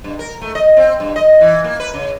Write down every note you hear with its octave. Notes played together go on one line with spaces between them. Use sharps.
G2
A#4
A3
D#5
C4
G2
D#5
E3
A#3
B4
C#3